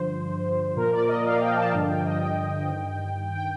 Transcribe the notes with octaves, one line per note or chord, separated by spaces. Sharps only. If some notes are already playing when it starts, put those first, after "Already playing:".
Already playing: G2 D3 F3 C5
A#2 F3 A#4
D5
D#5
F5
G5
A5
G2 D3 F3
G5
D#5
G5
G2 D#3
G5